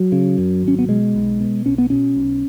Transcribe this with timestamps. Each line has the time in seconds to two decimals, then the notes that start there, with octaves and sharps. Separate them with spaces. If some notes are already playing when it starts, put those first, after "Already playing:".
Already playing: F#3
0.12 C#3
0.38 F#2
0.63 G#1 C#4
0.79 B3
0.89 B2 G#3
1.15 B1
1.40 B2
1.66 B1 C#4
1.78 B3
1.90 B2 C#4
2.16 B1